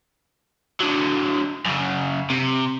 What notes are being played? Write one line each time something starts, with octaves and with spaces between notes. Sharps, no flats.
D3 F#3
F#2 C#3
C3